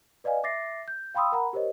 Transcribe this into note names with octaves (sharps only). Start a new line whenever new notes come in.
B4 D5 D#5 F5 G#5
E5 D6 A6 A#6 C7
G6
F5 G5 B5 C6 D#6 E6
A#4 F#5 A#5 B5
G4 A#4 C5 C#5 D#5